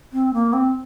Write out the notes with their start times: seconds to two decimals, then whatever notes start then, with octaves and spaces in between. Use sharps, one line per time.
0.13 C4
0.34 A#3
0.53 C4